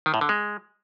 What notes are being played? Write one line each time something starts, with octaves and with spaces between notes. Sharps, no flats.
D#3
A2
D3
G#3